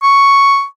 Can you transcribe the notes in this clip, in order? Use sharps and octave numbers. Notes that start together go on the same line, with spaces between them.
C#6